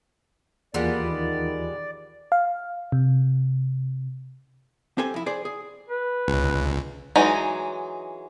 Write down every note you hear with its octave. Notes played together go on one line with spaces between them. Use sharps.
D#2 E3 G3 G#3 A#3 B3 F4 D5
D#3
F5
C3
C4 G4 A4 C5 G#5
F2 E4
G#4 C5 D5
G#4
B4
C#2
E3 F#3 G#3 D#4